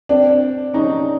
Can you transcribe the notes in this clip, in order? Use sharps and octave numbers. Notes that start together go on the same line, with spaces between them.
C4 D4
C#4 D#4